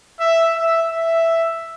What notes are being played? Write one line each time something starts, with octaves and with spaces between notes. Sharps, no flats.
E5
E5
E5